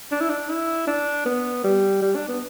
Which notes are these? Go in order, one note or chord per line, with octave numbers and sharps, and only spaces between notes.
D4
E4
D4
E4
D4
B3
G3
G3
D4
B3